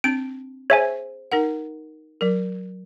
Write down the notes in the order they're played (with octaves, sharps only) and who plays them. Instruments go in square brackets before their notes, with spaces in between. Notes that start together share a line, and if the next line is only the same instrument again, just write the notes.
[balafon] C4 D4 [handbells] D7
[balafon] G#4 C5 [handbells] C#5 E5 G#5
[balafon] D#4 A#4 F#5
F#3 A#4